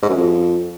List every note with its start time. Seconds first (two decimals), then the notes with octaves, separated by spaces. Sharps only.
0.02 G#2
0.09 F#2
0.16 F2